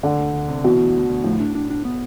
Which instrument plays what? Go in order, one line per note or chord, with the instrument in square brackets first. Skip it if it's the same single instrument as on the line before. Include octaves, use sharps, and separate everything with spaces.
[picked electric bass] D2 [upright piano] D3
[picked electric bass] D2
D2
C3
[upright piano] B2 [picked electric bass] E3
[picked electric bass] D2
D2
D2
[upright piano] A2 [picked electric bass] F3
[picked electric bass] D4
D4
D4
B3